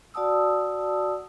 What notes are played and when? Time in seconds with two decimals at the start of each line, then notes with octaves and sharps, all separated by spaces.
0.14 F#4 D5 F#5 A5 D#6 E6